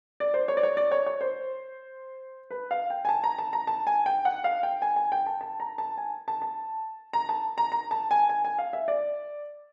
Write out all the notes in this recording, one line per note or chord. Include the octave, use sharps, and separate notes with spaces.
D5
C5
C#5
D5
C#5
D5
C#5
C#5
C5
B4
F5
G5
G#5
A5
A#5
A5
A#5
A5
G#5
G5
F#5
F5
G5
G#5
G#5
G5
A5
A5
A#5
A5
G#5
A5
A5
A#5
A5
A#5
A#5
A5
G#5
G#5
G#5
F5
E5
D5